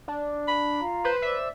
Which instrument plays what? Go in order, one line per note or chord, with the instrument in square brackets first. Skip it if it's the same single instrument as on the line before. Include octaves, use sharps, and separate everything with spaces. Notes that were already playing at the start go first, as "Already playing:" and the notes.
[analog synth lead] D4
[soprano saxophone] B5
[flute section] F4 F5 A#5
[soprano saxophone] B4 [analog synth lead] C5
[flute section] C5 D5 D6 [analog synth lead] E5